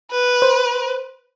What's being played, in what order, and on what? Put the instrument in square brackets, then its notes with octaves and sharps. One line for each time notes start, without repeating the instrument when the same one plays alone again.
[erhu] B4
[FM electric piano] C5